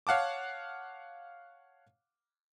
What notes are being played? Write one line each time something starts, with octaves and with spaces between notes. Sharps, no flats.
C#5 F5 F#5 A5 D6